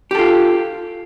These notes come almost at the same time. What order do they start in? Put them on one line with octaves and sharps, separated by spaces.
G4 A4 F4